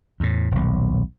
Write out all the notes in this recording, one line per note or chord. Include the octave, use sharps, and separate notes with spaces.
E2 A2
D#1 B1